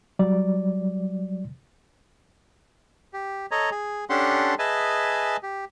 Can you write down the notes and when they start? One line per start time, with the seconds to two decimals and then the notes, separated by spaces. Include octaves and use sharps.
0.19 F#3 G3 D5
3.13 G4
3.51 A4 C#5 D#5 A#5
3.71 G#4
4.10 C#4 D4 G4 A4 F#5 C6
4.59 G#4 B4 D#5 E5 G#5 A5
5.43 G4